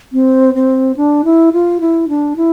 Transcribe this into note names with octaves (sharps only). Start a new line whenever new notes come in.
C4
C4
D4
E4
F4
E4
D4
E4